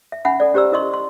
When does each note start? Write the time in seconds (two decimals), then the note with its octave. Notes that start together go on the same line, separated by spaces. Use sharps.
0.12 E5
0.25 C#4 E5 F#5 G#5 B5
0.40 A4 D5
0.54 C#4 G4 C5 D5 A#5 E6
0.72 E4 A#4 D#5 C6 C#6
0.94 C6